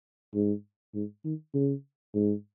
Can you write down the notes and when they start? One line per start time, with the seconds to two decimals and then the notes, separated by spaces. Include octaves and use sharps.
0.35 G#2
0.95 G#2
1.25 D#3
1.54 C#3
2.14 G#2